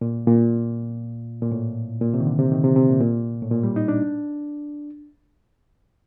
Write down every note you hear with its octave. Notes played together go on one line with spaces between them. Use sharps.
A#2
A#2
A#2
A2
A#2
C3
D#3
D3
C3
D#3
C3
C3
A#2
A#2
A2
A#2
G3
D#4
D4